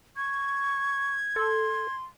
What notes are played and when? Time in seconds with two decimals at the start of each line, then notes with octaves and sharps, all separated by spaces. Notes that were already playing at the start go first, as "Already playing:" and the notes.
0.17 C#6 G#6
1.36 A4 C6